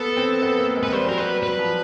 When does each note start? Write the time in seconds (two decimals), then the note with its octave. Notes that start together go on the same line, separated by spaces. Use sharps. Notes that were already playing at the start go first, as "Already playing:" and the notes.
Already playing: B3 A4
0.17 C4
0.42 B3
0.58 A#3
0.76 G#3
0.83 B4
0.92 G3 C5
1.05 F#3 A#4
1.18 G3 B4
1.42 F#3 B4
1.59 F3